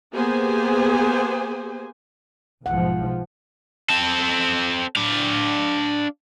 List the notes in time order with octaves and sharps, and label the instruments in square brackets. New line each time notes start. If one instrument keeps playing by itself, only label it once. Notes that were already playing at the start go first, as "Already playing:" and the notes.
[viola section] A#3 B3 G4 G#4 C5 G#5
[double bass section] B1 G#2 F3 [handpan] F#5
[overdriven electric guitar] C4 A4
D4 F5